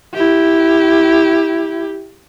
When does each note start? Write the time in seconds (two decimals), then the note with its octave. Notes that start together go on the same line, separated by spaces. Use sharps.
0.15 E4 G4